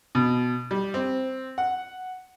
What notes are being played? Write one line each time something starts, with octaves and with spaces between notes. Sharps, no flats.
B2
G3
C4
F#5